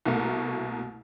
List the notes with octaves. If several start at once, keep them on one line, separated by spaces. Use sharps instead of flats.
C2 B2 A3 A#3